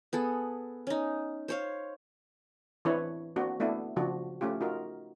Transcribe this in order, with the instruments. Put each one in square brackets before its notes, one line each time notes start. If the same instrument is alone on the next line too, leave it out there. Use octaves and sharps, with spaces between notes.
[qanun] B3 G#4 A4
C#4 D#4
C5 C#5 F5
[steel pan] E3 C4 D4 E4 B4 C#5
A#3 C4 D4 F#4
A3 B3 D4 E4
C#3 F3 D4 F#4
A3 C#4 F4 G4
D#4 F4 F#4 A#4